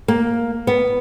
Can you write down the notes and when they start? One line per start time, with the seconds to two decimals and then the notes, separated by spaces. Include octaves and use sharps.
0.08 A#3
0.67 B3